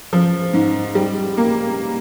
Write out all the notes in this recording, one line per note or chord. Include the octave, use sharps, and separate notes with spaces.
F3
G#2
G3
A#3